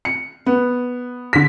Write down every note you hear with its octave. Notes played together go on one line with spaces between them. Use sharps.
C#7
B3
D3 B6